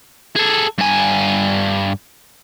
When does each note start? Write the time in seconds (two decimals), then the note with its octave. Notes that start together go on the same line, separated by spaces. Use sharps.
0.36 G#4 A4
0.78 G2 G#5